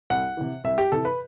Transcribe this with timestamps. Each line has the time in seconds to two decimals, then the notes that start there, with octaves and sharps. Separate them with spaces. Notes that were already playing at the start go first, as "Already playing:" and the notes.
0.10 C2 F#5
0.37 C3 E3
0.64 C2 E5
0.78 G4
0.92 C3 E3 A4
1.05 B4